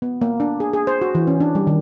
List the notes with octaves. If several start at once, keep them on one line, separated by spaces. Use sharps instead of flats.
B3
A#3
D4
G#4
G#4
C5
F#4
E3
C#4
D4
G3
D#3